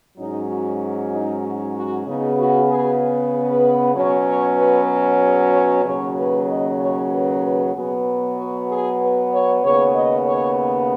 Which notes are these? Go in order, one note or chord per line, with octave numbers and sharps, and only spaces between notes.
G#2 F#3 C#4 D#4
F#4
D#4
F#4
F#4
C#3 B3 D#4
F#4
G#4
B4
B2 F#3 C#4 C#5
C#5
B4
F#4
G#4
C#5
D#2 C#3 F#3 C#4 C#5
B4
D#5
C#5
B4
B4
B2 F#3 B3 G#4
F#4
G#4
B4
C#5
D#2 C#3 B3 C#5
D#5
C#5